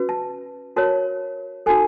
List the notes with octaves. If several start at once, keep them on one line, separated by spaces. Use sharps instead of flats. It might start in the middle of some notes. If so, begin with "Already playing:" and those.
Already playing: C#4 F#4 B4
A5
F#4 A#4 C#5 A5
D#4 F#4 A4 G#5